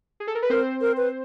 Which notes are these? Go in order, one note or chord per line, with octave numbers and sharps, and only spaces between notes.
G#4
A4
A#4
B4
C4 A#4 C5
A#4
B4